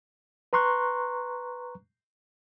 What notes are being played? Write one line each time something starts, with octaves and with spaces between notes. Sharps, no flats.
B4 A#5 C6 C#6 F#6